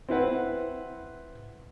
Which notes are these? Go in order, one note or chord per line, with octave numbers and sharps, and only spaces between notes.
C4 E4 B4 F#5